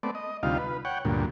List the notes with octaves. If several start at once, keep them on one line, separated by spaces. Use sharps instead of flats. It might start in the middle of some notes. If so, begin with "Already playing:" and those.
A3 B3 C4 D5
D#5
D2 C3 G3 D#4 F4 F5
B4
C#5 F#5 G5
D2 G2 A#2